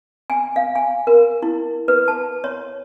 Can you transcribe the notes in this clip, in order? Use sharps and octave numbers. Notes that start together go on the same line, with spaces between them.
G#5
F5
G#5
A#4
E4
B4
A5
C#5